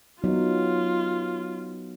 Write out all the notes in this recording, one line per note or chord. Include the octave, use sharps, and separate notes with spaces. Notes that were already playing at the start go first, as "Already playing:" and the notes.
F#3 B3 D#4 F4